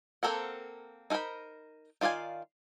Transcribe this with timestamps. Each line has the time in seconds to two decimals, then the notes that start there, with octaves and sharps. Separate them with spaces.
0.23 A#3 C4 A4 A#4 F#5
1.10 D#4 A4 A#4 C5 B5
2.01 D#3 F4 D5 F5 G#5